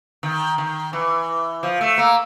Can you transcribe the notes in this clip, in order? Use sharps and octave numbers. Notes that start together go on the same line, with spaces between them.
D#3
D#3
E3
F3
A3
A#3